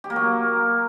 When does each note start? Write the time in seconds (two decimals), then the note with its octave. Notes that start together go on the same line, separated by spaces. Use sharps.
0.04 G4
0.10 A#3
0.16 F#3